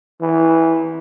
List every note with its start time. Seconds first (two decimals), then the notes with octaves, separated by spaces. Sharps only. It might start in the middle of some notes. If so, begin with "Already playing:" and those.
0.22 E3